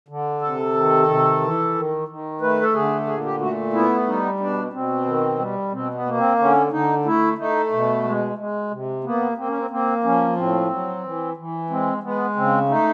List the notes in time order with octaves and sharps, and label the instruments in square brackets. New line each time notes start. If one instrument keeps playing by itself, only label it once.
[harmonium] D3
C3 A4
D#3
C3
E3
D#3
D#3
A3 B4
A4
D3 G#4
A#2 G#4
G4
A3 F#4
B3 E4
G3 D#4
B2 D4
B2 C4
D#3
G3
B2 C4
B3
A#3
C4
D3 C#4
D3 D#4
A3 E4
A3 D#4
B2
G#3
G#3
C3
A#3 B3
A#3 C4
C#4
C4
A#3 C4
F3 C#4
A2 C4
F#3
E3
E3
G#3 C4
G#3 B3
C#3 C4
A3 D#4